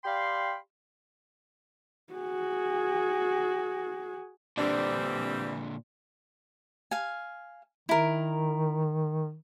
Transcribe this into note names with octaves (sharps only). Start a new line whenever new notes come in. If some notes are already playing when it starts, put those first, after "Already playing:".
G4 D5 F5 G5 B5 C6
F#4 G#4
A#2 D3 E3 G3 C4 D4
F5 G#5
D#3 E4 A#4